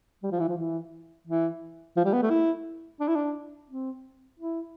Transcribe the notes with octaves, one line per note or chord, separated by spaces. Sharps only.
G3
F3
E3
F3
E3
E3
F3
G3
B3
A3
E4
D4
E4
D4
C4
E4